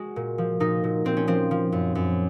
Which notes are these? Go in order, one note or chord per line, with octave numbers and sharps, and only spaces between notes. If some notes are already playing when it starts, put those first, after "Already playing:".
Already playing: G#3 F#4
A#2
F3
A#2 D#4
A#2
A#2 C4
C#4
F3 C4
F3
F#2
F#2